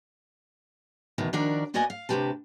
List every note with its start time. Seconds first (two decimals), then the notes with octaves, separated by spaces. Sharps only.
1.18 E2 B2 D#3
1.33 D#3 F3 D4 F#4 A#4 D5
1.74 A#3 B3 F#4 D5 D#5 G#5
1.90 F5
2.09 D2 C3 D#3 G4 B4 A5